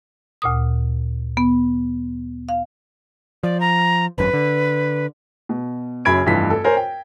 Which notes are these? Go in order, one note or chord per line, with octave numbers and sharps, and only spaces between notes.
D2 A#2 D#6
B3
F5
F3 D5
A#5
G#1 F#2 B4
D3
B2
F#1 F#2 B5 G#6 D7
F1 G2 E3 F4 B6
A4
A#4 C5 C#5 G#5
G5